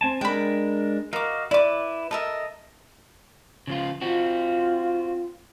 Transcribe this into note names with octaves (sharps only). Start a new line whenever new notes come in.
C4 G#5 A5
G#3 D4 A#4 G5 B5
F#4 A#4 D#5 F5 D6
E4 B4 D5 D6
A4 A#4 D#5 E5
C#3 F3 F4
C4 F4 F#4